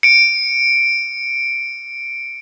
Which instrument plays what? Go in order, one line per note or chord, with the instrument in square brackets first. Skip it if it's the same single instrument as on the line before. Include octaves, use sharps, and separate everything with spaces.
[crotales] C#7 D7